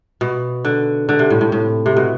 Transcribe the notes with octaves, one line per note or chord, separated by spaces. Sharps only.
B2
D3
D3
C3
A2
A2
A2
C3
B2